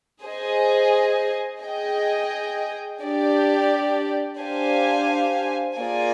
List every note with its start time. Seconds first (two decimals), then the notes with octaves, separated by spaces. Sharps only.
0.23 G#4 C5 D#5 G#5
1.62 G#4 D#5 G5
3.00 D4 G4 D5
4.38 D4 G4 C5 F5 G#5
5.77 A#3 F4 G#4 D5 G#5